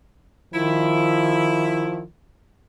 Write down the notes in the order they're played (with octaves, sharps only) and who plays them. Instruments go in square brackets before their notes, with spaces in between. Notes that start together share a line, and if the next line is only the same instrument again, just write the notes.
[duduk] D#3 [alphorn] F3 [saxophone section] E4